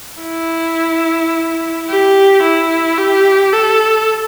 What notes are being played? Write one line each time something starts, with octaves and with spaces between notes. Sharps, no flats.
E4
G4
E4
G4
A4